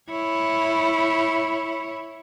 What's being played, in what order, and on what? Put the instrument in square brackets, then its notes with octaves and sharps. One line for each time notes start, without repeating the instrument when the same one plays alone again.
[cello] E4 C#5